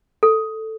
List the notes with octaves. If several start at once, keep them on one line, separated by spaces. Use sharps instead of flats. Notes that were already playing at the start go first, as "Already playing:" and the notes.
A4